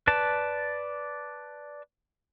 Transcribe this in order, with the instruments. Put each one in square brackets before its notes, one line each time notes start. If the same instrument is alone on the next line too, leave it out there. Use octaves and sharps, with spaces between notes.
[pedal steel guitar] B4 D5 A5